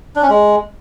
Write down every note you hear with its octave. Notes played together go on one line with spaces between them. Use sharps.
D4
C#4
G#3